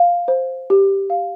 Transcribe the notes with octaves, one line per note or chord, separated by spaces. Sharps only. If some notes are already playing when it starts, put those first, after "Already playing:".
Already playing: F5
C5
G4
F5